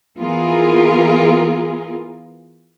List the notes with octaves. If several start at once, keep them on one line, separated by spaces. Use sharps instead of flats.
E3 B3 F4 G#4 A#4